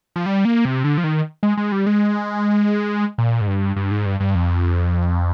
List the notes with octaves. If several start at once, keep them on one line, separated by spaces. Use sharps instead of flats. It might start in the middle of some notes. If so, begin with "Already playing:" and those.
F3
G3
A#3
C3
D3
F3
D#3
G#3
G#3
G3
G#3
A#2
G#2
G2
G2
G#2
G2
G2
F2